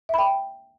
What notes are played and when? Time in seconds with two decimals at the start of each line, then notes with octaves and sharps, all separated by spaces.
0.09 E5
0.14 B5
0.18 G5